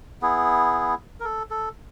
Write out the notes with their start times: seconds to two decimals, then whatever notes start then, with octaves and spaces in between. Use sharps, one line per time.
0.22 B3 E4 G#4
1.20 A#4
1.25 A4
1.51 A4